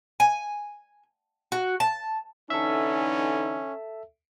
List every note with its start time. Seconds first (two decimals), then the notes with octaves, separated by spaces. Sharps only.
0.20 G#5
1.52 F#4
1.80 A5
2.50 D3 E3 C#4 D#4 A4 E5